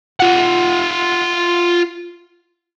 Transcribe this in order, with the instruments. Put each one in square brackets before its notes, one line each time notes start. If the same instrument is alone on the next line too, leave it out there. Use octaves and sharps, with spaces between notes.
[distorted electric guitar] F4 F#5